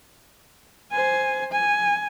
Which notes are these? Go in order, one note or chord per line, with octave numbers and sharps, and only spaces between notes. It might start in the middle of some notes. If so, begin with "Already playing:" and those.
C5 G#5
G#5